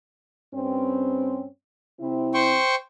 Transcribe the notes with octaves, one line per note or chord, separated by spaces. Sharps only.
G2 C4 C#4
C3 C4 E4
C5 G5 C#6